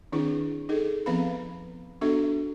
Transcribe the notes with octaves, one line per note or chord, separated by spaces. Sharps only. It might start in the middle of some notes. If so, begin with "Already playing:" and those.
D#3 C4 D4 E4 G#4 B4
D#4 G#4 A4
F3 B3 C4 B4 F5 B5
B3 D4 F#4 A4 E5